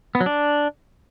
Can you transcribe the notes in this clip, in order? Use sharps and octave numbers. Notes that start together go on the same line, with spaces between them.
B3
F#3
D4